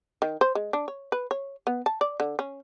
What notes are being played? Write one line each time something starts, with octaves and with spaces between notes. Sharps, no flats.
D#3
C5
G#3
D4
C#5
B4
C#5
B3
A5
D5
D3
C#4